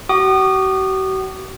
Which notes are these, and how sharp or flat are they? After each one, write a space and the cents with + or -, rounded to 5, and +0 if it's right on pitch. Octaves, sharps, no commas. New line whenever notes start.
F#4 +45 D#6 -35